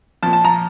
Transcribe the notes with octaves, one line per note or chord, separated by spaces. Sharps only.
A#2 F3 A5
A5
A#5